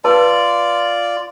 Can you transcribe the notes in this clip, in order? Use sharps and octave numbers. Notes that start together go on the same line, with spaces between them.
F4 B4 D5 A5